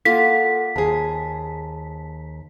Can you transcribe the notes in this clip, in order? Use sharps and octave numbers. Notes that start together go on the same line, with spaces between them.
A#3 F4 A4 F#5 B6
D#2 G#4 C5 A5